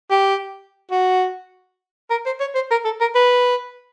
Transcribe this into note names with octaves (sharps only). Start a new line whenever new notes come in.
G4
F#4
A#4
C5
C#5
C5
A#4
A4
A#4
B4